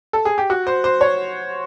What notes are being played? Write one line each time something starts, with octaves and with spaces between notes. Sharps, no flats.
A4
G#4
G4
F#4
C5
C5
C#5